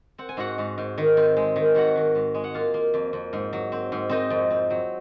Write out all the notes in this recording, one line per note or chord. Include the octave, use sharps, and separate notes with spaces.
C4 F#5
G#5
G#2 F#4 F#5
G#2
G#2
D#3
C4
G#3
D#3
G#2 F#4 F#5
D#3
G#2
G#3
F#5
A#3 F4 F5
A#3
F2
F2
G#2
F#3
C4
G#2
C4 D#4 D#5
F2
C4
F#3